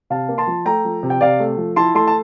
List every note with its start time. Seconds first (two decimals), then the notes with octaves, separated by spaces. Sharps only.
0.10 C3 F5 A5
0.29 A#3
0.38 A5 C6
0.47 F3
0.65 A3 G5 A#5
0.85 F3
1.03 C3
1.10 G5
1.21 C3 D5 F5
1.40 A3
1.58 F3
1.76 E4 A5 C6
1.95 A3 A5 C6
2.07 A5